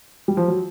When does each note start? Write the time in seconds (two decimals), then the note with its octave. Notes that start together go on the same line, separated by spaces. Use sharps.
0.28 G3
0.37 F3
0.48 F#3